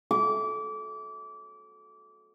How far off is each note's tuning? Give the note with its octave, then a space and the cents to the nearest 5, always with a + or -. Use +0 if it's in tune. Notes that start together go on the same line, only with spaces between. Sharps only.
D6 -25